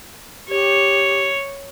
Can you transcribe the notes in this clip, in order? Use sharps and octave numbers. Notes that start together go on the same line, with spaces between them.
G4 C#5